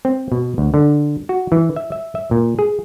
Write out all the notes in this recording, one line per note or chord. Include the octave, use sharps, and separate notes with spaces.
C4
B2
D2
D3
F#4
E3
E5
E5
E5
A#2
G#4